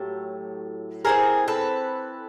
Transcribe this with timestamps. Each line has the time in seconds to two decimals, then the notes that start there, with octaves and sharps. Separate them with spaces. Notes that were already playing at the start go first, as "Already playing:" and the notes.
Already playing: A2 F#3 A3 G4 A4
1.05 E3 G3 C4 G#4 A#4
1.48 A4 B4